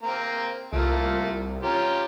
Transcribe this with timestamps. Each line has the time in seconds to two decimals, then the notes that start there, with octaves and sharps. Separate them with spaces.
0.03 A#3 C4 A#5
0.73 C2 A3 A#3 F4
1.63 C#4 F4 G4 A#5